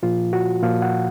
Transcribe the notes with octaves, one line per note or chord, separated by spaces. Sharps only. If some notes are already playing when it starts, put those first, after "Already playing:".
A#2 F3 F4
F#4
A#2 F3 F5
F#5